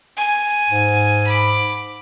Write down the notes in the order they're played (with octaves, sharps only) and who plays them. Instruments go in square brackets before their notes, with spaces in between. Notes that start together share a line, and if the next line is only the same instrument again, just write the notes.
[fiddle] G#5
[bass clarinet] G#2
[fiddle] B5 D6